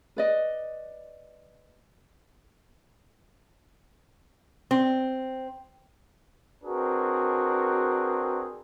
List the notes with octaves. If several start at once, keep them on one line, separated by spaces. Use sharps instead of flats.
B4 D5 D#5
C4
C4 D4 F#4 G#4 A#4 B4